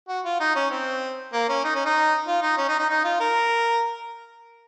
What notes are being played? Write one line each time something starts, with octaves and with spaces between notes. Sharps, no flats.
F#4
F4
D#4
C#4
C4
A#3
C#4
D#4
C#4
D#4
F4
D#4
C#4
D#4
D#4
D#4
F4
A#4